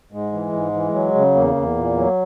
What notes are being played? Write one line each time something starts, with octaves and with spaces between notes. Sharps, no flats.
G#2 G#3
E3
G#2
E3
F#3
C#3
E2 A#3
E2
A#2
F#3